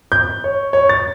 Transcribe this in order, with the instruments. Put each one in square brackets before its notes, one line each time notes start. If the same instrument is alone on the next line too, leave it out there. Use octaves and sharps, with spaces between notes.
[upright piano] G6
C#5
C#5
A6